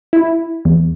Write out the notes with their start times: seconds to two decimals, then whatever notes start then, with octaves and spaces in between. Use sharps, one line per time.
0.13 E4
0.65 E2